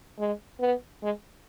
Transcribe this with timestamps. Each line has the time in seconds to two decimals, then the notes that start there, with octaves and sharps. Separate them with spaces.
0.19 G#3
0.60 B3
1.03 G#3